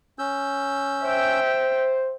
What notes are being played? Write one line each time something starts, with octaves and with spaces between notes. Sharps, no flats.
C#4 E6 G6
C5 E5 G5